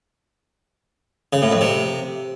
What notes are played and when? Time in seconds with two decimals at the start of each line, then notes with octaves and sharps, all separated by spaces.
1.33 C#3
1.42 A2
1.52 F2
1.61 C3